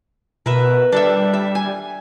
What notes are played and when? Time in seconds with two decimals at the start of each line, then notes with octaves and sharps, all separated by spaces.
0.46 B2 A#4 B4 E5
0.92 G3 D4 A4 E5
1.33 E5
1.55 G#5